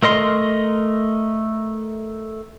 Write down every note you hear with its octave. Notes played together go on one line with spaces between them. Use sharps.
A3 A#4 D#5 C6